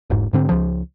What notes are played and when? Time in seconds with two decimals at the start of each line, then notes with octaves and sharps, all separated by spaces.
0.10 E1 G#2
0.33 G#2 D3 C4
0.49 C#2 F3